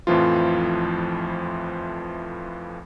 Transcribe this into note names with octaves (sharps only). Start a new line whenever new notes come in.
F2 A2 E3 F3 F4